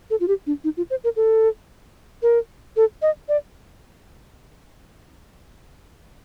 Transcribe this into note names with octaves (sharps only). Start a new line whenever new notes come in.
A4
F4
G4
D4
D#4
F4
C5
A#4
A4
A#4
A4
D#5
D5